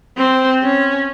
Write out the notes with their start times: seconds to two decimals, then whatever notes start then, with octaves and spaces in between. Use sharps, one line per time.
0.17 C4
0.63 C#4